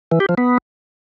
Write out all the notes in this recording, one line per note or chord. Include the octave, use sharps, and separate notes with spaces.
E3
G4
F3
B3